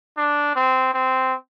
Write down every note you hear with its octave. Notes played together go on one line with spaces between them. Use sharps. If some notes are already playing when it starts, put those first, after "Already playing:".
D4
C4
C4